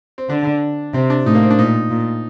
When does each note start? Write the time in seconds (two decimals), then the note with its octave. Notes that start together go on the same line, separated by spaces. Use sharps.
0.18 C4
0.29 D3 D4
0.94 C3 C4
1.10 D4
1.26 A2 D#4
1.35 A#3
1.43 C4
1.50 D4
1.59 A#2 D#4
1.90 A#2